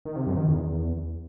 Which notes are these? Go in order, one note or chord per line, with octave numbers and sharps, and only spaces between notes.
D#3
C3
F#2
D#3
E2